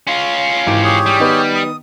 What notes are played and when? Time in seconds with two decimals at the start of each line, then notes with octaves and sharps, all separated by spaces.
0.07 C#4 F4 C6
0.66 G#1 E3 G4 D7
0.84 G4 G#4 C#5
1.06 G3
1.20 D#3 B3
1.55 D#6